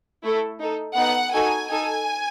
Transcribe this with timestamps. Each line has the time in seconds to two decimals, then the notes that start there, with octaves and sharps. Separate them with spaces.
0.23 A3 E4 A4
0.60 D#4 A4
0.97 B3 D#4 A4 F#5
1.33 D#4 F#4 A4 G#5
1.70 D#4 A4 G#5